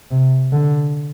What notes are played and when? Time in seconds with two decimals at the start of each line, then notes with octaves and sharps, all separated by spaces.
0.11 C3
0.53 D3